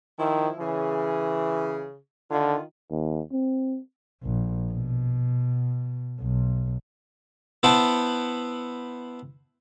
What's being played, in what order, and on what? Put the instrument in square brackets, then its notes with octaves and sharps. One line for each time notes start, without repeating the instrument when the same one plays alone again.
[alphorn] D#3 [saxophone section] F3 E4
[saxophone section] C#3 G#4 [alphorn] E3
[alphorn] D3 [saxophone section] D#3 F4
[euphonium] D#2
C4
[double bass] A#1
B2
B1
[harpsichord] B3 E4 C5 F#5 G5 A5